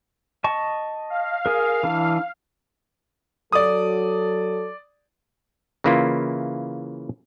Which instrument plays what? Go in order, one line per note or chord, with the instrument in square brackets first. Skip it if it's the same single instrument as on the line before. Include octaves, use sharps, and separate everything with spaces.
[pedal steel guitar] D#5 A5 C#6
[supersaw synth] F5
[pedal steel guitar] G#4 A#4
E3 D4
[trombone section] F#3 A4 [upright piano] D5 D#6
[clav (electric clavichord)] C#3 E3 A#3 E4 F4